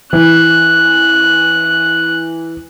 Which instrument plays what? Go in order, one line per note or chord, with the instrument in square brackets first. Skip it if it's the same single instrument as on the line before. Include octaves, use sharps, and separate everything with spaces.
[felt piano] E3 [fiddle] F#6